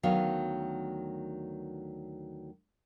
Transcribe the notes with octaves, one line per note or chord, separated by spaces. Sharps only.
D2 D#3 F#3 B3 F5